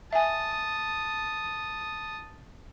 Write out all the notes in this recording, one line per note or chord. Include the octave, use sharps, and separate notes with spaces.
E5 G#5 A5 D#6